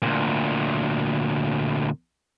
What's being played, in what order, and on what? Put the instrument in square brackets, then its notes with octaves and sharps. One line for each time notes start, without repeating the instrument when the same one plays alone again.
[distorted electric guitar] D2 A#2